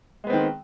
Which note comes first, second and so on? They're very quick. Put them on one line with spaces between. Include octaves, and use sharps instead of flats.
G#3 B3 C4 D#3